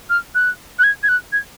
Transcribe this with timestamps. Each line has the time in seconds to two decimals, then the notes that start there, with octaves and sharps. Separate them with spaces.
0.10 F6
0.35 F#6
0.79 F#6
0.84 G#6
1.03 G#6
1.09 F#6
1.33 G#6